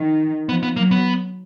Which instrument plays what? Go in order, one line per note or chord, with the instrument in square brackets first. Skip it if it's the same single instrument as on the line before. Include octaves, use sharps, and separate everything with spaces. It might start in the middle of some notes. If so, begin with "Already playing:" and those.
Already playing: [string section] D#3
[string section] F3 [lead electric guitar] B3
[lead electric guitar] B3
[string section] F#3 [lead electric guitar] A#3
[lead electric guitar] B3